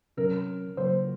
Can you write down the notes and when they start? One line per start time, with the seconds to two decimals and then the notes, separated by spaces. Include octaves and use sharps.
0.17 C3 F#3 C#4 A#4
0.77 C#3 F#3 A#3 C5